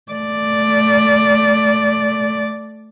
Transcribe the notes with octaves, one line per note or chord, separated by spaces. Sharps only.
A3 D5